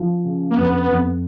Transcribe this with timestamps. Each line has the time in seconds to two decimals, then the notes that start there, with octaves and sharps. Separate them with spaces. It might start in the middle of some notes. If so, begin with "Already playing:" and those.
Already playing: F3
0.24 C#3
0.50 A#3
0.56 F2 B3
0.89 F2